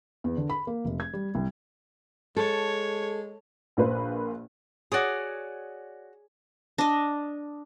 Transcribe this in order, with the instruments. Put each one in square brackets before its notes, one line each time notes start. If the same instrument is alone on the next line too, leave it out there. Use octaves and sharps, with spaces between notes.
[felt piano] E2
D3
B5
A#3
F1
G#6
G3
C2
[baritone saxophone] G#3 [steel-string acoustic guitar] A4 [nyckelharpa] C#5
[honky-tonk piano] A#1 A#3 B4 C5
[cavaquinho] F#4 D#6 [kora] G#4 C#5 D5
[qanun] D4 D#5